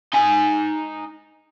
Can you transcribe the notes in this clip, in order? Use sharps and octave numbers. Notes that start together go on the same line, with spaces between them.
D#4 G#5